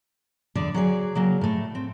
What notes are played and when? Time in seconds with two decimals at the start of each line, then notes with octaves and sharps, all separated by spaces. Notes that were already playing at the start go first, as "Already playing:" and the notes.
0.55 E2 D3 D5
0.74 F#3 G#4 D5
1.15 C#3 F#3 A#3
1.41 A2 A3
1.75 C4